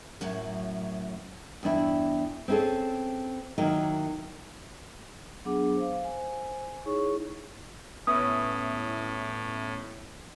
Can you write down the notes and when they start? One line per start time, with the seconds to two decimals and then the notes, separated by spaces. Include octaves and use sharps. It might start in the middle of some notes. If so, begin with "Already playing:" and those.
0.21 F#2 A2 F#3
1.63 E2 G2 D4 E4
2.48 C4 C#4 E4 G#4 A4
3.58 D#3 F#3 A#3 E4 D#5
5.45 F#3 B3 D4 G#4 F#5 D6
5.77 C5 F5
6.04 C5 G#5
6.85 D#4 E4 G#4 C#5 C#6
8.07 A2 B3 C#4 E4 D#6